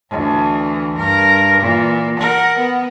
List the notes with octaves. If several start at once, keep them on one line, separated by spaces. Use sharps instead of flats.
D2 E3
G2 A#4
A#2 E3
A#4 F#5
B3